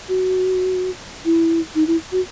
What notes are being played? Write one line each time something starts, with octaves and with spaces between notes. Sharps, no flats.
F#4
E4
D#4
E4
F#4